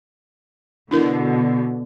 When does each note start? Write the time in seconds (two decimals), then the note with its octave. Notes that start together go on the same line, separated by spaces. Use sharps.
0.91 B2 D3 D4 E4 A#4